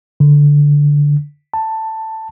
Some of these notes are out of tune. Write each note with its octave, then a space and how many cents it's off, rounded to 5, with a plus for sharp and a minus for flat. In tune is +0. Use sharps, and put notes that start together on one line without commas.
D3 -10
A5 +10